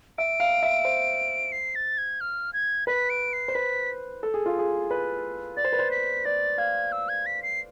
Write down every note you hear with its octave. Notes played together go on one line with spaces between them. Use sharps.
E5 D7
F5
E5
C5
C7
A6
G#6
F6
G#6
B4 B6
D7
C7
C5
B4 B6
A4
G#4
F4
G#4
B4
D5 A6
C5
B4
C5
B6
D5 A6
F5 G#6
E6
G#6
B6
C7